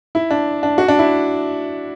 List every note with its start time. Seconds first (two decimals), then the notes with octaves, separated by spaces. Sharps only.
0.15 E4
0.30 D4
0.63 D4
0.78 F#4
0.88 D4
0.99 E4